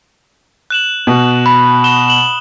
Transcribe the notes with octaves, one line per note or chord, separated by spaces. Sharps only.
F#6 E7 F#7
B2
B5
D#6 E7 G7
E7 F#7 G7